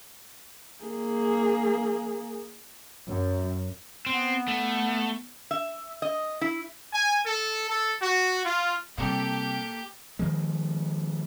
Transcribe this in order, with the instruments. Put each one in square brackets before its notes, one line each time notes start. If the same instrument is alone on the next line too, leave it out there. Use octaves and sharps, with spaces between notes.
[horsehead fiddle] A#3 G#4
[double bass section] F#2
[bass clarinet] B3 [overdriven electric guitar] C4
[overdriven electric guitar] A3
[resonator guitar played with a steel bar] E5
D#5
E4
[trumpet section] G#5
A4
A4
F#4
F4
[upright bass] C3 G3 [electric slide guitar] A#3 A4 [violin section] G4
[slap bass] D#3 F3 G#3